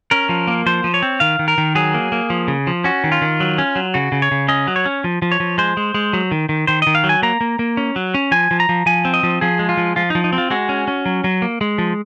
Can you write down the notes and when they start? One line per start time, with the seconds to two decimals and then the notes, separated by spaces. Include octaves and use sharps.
0.11 C#4 A#4
0.29 F3
0.48 A#3
0.66 F3 C5
0.84 F3
0.94 C#5
1.02 C4
1.20 D#3 F5
1.39 D#3
1.48 A#4
1.58 D#3
1.75 F#3 G#4
1.94 A#3
2.12 A#3
2.30 F3
2.48 C#3
2.67 F3
2.84 C#4 F#4
3.04 D#3
3.12 F4
3.22 D#3
3.40 F#3
3.58 C#4
3.76 F#3
3.94 C#3 F#4
4.12 C#3
4.22 C#5
4.31 C#3
4.48 C#4 D#5
4.67 F#3
4.76 C#5
4.86 C#4
5.04 F3
5.22 F3
5.32 C#5
5.40 F3
5.58 G#3 C5
5.77 G#3
5.94 G#3
6.13 F#3
6.31 D#3
6.49 D#3
6.67 D#3 C5
6.82 D#3 D#5
6.95 F5
7.04 F#3
7.09 G#5
7.23 A#3 A#5
7.41 A#3
7.59 A#3
7.77 C#4
7.96 F#3
8.14 C#4
8.32 F3 G#5
8.51 F3
8.60 A#5
8.69 F3
8.86 F3 G#5
9.05 C4
9.14 D#5
9.23 F3
9.41 F3 G#4
9.59 G#3
9.69 F4
9.77 F3
9.96 F3 F4
10.10 D#4
10.15 F3
10.24 D#4
10.33 C4
10.38 F4
10.51 G#3 F#4
10.69 C#4
10.88 C#4
11.06 F#3
11.24 F#3
11.42 A#3
11.61 G#3
11.78 F3